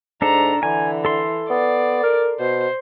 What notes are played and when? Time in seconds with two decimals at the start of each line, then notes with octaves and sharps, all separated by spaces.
0.22 G#2 D4 A4 A#5
0.63 D3 E3 G#5
1.05 A4 C6
1.50 B3 D5
2.03 A#4
2.40 B2 C5